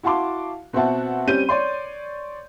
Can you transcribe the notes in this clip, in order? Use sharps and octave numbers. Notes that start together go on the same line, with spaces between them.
E4 F#4 F5 A5 C6 D6
B2 C4 F#4 E5 F#5 A5
G3 C4 C#4 G6 D#7
C#5 D5 C6